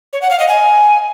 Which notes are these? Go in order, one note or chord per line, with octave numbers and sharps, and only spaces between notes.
C#5
F#5
F5
D#5
G#5